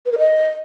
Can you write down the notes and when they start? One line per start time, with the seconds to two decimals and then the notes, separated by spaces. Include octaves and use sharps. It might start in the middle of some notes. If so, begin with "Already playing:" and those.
0.06 B4
0.12 A#4
0.18 D#5